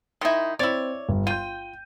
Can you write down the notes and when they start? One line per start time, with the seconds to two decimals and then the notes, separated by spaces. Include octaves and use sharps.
0.21 D#3 D#4 E4 C6
0.59 C4 E4 C#5 D5
1.09 G1
1.27 F4 G5 G6 D#7